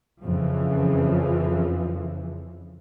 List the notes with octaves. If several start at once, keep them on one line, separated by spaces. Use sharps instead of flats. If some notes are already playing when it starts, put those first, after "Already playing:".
F2 C#3 E3 F3